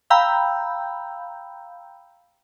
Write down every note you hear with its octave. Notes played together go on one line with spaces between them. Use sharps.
F5 G5 A#5 B5 E6 G6